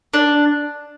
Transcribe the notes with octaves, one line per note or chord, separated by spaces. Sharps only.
D4